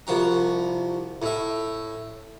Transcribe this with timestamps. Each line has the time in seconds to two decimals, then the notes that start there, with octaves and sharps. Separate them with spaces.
0.07 C2 F3 F#4 A#5
1.22 A2 E5